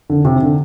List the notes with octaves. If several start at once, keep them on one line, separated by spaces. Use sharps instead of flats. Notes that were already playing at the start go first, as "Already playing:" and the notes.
D3
C3
D3